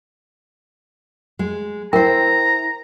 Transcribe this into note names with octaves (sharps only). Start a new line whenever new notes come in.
G#3
E4 A#4 C5 G5 A#5